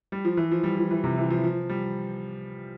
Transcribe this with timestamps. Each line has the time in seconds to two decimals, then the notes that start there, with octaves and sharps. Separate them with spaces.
0.12 G3
0.25 F3
0.37 E3
0.51 F3
0.63 G3
0.78 F3
0.91 E3
1.04 C3
1.17 E3
1.30 F3
1.44 F3
1.69 G3